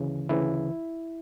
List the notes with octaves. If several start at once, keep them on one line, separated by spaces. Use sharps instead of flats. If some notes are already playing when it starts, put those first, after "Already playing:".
Already playing: D2 C#3 E3
D2 C#3 E3 E4